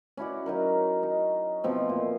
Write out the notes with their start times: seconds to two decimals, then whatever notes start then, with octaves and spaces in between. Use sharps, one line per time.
0.17 C#4 E4 F#4 D5
0.46 F#3 D#4 A#4
1.03 D#4
1.64 B2 F3 A3 C4
1.89 A#2